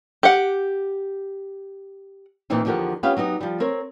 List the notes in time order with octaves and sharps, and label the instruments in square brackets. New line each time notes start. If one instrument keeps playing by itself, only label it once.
[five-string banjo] G4 F#5
[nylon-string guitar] A#2 E3 F3 C4 D#4
E2 D3 F3 G4 A#4 F#5
B3 C#4 F4 G4 F5
F#3 B3 D#4 G4
F3 G3
C4 A#4 C#5